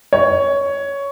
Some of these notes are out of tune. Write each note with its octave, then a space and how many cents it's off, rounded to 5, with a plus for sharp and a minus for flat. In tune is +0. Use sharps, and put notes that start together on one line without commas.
C#5 +10